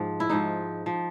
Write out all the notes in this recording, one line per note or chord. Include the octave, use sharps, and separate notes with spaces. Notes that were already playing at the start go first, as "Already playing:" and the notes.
Already playing: G#2 F3
E4
G#2 F3 D#4
F3